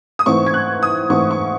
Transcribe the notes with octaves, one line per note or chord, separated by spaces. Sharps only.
D#6
G#2 E3 A3 C4 C#6
G#6
F#6
D#6
G#2 E3 A3 C4 C#6
C#6